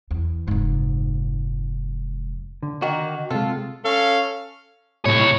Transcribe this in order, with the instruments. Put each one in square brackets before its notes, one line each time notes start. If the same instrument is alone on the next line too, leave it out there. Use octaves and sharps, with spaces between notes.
[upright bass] E2
F1 G#2
[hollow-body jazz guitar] D3
[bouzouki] D#3 A#3 [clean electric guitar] F#4
[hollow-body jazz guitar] C3 G#3 [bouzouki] F4 [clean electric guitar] A4
[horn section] C#4 A4 F5
[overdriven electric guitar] B1 C#5 [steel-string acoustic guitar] A2 C3